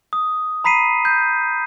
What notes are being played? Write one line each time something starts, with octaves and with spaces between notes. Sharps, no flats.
D#6
A#5 B5 B6 C7 D#7
G6